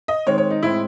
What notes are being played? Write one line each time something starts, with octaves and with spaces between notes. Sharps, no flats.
D#5
D#3 G#3 C4 C#5
C#5
D#4
A2 G#3 C4 E4